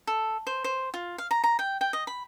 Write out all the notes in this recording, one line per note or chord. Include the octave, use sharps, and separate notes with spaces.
A4
C5
C5
F4
F5
A#5
A#5
G5
G5
D#5
B5